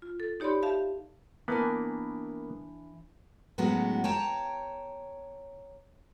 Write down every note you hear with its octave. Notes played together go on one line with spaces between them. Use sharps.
F4
A4
D#4 G4 C#5 D5 B5 C6
G4 E5 F5 A5
E3 A#3 B3 D4 G#5
A2 F#3 G#3 B3 C#4 F#4
C#5 G5 A5 A#5